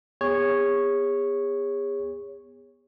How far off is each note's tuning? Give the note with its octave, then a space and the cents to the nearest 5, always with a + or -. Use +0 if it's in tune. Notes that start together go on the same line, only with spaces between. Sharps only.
B3 +0 G#4 -40 C#5 -5